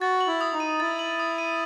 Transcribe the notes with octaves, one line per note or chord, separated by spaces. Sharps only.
F#4 A6
F#7
E4
D#6
D#4
D#7
E4 A6
F#7
D#6
D#7